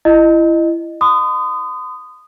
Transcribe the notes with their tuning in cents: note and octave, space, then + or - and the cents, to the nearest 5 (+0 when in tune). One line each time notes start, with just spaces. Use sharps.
E4 +25 D#5 -15
C6 -45 D#6 -10